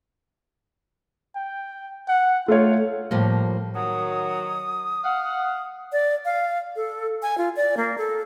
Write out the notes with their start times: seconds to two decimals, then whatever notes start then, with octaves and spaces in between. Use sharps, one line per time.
1.36 G5
2.08 F#5
2.48 A3 F4 C#5
3.11 A2 F3 G3 A#3
3.75 D#3 F#3 D#6
5.04 F5 F#5
5.92 D5
6.25 F5
6.76 A4
7.22 G#5
7.38 F4
7.56 D5
7.77 A#3
7.98 A4